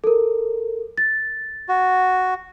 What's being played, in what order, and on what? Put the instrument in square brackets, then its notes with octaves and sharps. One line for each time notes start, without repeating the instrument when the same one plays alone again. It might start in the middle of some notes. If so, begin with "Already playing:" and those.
[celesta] A4 A#4
A6
[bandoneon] F#4